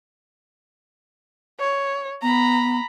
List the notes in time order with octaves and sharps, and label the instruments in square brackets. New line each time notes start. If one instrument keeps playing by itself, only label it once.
[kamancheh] C#5
[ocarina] B3 [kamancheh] A#5 B5